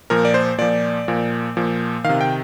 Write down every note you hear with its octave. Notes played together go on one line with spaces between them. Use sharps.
A#2 F3 A#4
D5
C5
A#2 F3 D5
A#2 F3
A#2 F3
C3 D#3 F5
G5